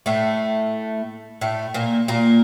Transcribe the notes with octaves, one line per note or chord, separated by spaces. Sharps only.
A2 A3
A2 A3
A#2 A#3
A#2 A#3